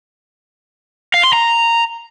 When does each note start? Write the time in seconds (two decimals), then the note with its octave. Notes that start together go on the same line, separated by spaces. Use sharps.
1.14 F5
1.24 C6
1.33 A#5